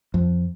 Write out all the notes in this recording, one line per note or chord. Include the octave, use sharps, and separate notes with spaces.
F2